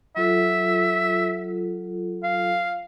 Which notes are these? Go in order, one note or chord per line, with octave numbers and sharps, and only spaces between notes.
F#3 F4 A4 E5
F5